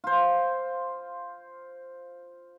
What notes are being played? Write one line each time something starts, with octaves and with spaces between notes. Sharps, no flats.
F4 C5